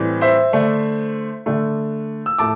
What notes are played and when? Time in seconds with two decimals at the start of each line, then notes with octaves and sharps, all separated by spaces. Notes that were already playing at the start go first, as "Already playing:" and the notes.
Already playing: A2 E3 G3 C4
0.21 C5 E5
0.53 D3 A3 D4
1.46 D3 A3 D4
2.26 E6
2.38 A2 A3 A5 D6